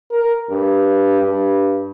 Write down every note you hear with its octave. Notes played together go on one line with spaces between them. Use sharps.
A#4
G2
G2